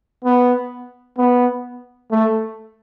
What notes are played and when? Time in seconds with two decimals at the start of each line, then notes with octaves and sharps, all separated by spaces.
0.24 B3
1.18 B3
2.11 A3